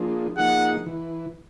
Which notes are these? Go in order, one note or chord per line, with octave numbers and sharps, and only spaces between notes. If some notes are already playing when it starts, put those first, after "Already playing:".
Already playing: F3 A#3 D4 F4 G#4
F3 A#3 D#4 G#4 F#5
E3